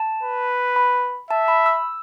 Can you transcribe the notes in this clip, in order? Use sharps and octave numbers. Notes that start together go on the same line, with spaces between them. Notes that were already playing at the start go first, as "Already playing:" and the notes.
Already playing: A5
B4
B5
E5 A5
B5
E6